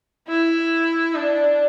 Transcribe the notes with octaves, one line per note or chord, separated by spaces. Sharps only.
E4
D4